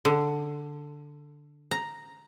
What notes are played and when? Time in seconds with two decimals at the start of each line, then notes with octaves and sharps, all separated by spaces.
0.05 D3
1.71 A#5